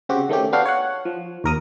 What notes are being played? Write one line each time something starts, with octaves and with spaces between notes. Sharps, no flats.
C#3 C4 F#4 G4
D#3 A3 C#4 G4
B3 D4 F#4 F5 G5
C#5 F#5
F3
D#2 A#4 D#6